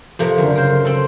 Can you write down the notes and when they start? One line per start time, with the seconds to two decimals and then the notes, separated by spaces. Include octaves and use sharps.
0.19 F2 C3 A#3
0.38 F#2 D3
0.55 C#3 A#4 C5
0.85 C4 A4